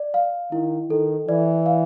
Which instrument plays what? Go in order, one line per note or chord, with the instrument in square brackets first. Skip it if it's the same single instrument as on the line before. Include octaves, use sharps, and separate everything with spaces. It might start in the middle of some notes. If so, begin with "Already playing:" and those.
Already playing: [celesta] D5
F5
[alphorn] D#3 [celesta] E4
[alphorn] D#3 [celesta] A4
[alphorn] E3 [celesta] D5
[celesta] F5